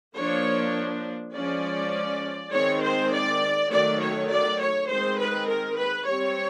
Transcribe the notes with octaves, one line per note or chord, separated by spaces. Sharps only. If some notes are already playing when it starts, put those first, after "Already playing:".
F3 A#3 D4 C#5
F3 G#3 C#4 D5
D#3 G#3 C4 C#5
C5
D5
D#3 F#3 A3 D5
C#5
D5
C#5
D#3 G#3 C4 C5
B4
A#4
B4
G3 C4 C#5